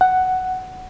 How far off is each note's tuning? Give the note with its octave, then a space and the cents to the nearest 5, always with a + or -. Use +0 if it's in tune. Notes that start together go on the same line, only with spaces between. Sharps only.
F#5 +5